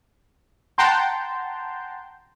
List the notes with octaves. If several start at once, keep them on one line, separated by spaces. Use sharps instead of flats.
F#5 G5 A5 A#5 C6 G6